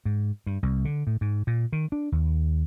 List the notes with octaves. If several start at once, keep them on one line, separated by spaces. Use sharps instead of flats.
G#2
G2
C2
D3
A2
G#2
A#2
D#3
D4
D#2